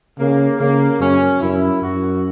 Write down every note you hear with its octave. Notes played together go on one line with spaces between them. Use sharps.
C#3 A#3
C#3 A#3
F#2 C#4
F#2 E4
F#2 F#4